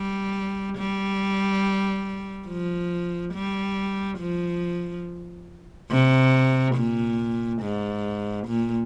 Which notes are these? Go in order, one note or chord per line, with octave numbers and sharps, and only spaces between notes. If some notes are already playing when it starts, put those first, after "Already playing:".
Already playing: G3
G3
F3
G3
F3
C3
A#2
G#2
A#2